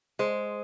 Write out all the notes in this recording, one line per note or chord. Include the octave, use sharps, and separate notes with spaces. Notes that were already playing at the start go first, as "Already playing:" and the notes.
G#3 C5